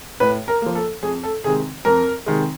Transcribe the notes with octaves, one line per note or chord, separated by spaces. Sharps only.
A2 B4
A#4
F3 A#3
A4
F2 G#4
A4
C3 D#3 G#3 G#4
F2 A#4
C3 D#3 G#3